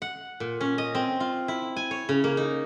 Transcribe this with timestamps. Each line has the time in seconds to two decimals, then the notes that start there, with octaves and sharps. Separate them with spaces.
0.02 F#5
0.40 A#2
0.61 C#4
0.78 D#5
0.95 C4
1.20 F4
1.48 E4
1.76 G#5
1.91 C#5
2.09 C#3
2.24 A#3
2.37 D#4